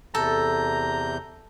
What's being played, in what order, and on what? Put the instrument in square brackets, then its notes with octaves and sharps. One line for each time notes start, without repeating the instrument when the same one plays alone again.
[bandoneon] E2 C3 G6 [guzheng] A4 [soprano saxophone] A#5